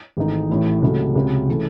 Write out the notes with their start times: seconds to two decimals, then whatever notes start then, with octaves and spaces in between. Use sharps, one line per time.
0.17 G#1 G#2 E3 A3 D#4
0.50 A1 A2 E3
0.82 C#2 C3 F#3 A3
1.16 C#2 C3 F#3
1.49 C#3 E3 A3